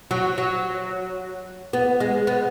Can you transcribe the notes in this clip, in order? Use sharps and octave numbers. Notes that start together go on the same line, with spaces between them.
F#3
F#3
B3
G#3
B3